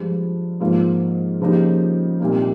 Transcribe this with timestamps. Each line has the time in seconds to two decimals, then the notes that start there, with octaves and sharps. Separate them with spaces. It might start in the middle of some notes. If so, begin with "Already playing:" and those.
Already playing: G2 F3 G#3
0.60 G#2 F3 A#3 F4
1.41 C#3 F3 A#3 D#4 G4
2.20 C2 A#2 G3 A#3 D#4